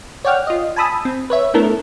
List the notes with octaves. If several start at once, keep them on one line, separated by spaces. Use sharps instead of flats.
C#5 D5 F#5 G5 F6
F4 D#5
G#5 A5 B5 D#6 E6
C4
B4 C#5 E5
A3 B3 D4 E4 A4 A#4